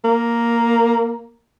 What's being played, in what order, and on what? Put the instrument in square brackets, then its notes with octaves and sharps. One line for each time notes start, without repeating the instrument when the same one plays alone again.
[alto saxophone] A#3